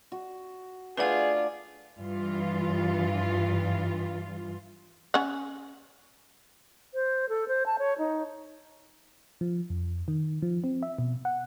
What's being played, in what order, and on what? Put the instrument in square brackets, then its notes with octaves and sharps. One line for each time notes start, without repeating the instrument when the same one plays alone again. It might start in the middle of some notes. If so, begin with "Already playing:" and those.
[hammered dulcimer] F#4
[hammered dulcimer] A3 D4 D5 [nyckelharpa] F4 [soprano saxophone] G#4 [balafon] B4 F#5
[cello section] G2 E3 F4
[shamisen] C#4 F#5
[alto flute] C5
A4
C5
A5
C#5
D#4
[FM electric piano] F3
F2
D#3
F3
C4
E5
B2
F#5